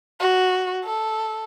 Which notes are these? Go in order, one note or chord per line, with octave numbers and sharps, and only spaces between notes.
F#4
A4